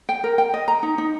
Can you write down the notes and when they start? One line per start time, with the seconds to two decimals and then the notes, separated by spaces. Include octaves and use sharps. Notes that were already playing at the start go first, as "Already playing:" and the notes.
0.09 G5
0.24 A#4
0.38 G5
0.54 D#5
0.68 A#5
0.83 D#4
0.98 D#4